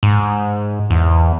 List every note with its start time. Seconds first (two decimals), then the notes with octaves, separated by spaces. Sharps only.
0.03 G#2
0.90 E2